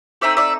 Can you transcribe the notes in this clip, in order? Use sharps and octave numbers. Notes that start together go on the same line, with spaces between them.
A3 C4 D#4 D5 E5
D5 E5